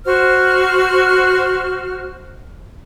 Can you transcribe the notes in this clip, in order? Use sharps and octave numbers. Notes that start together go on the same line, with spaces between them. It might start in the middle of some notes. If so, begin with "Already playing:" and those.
F#4 C5 F6